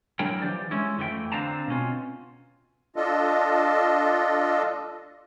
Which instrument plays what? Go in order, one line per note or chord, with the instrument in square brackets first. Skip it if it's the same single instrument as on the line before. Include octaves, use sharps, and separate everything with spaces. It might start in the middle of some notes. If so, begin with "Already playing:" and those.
[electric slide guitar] F#3 D4 E4 A#4 G5
E3 F3 G4 C5 D5
G#3 C#4 E4
F2 E3 A3 G5
D3 C4 D4 F5 A5 A#5
B2 C4 C#4 F4
[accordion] D4 F4 A4 D#5